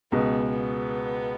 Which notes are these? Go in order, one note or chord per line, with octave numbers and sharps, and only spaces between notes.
C#2 B2 G#3 B3
B3